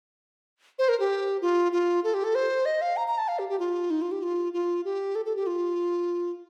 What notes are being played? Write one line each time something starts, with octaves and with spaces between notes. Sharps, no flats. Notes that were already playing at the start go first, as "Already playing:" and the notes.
C5
A#4
G4
F4
F4
A4
G4
A4
C5
D#5
F5
A#5
A#5
A5
F5
G4
G4
F4
D#4
F4
G4
F4
F4
G4
A4
A4
G4
F4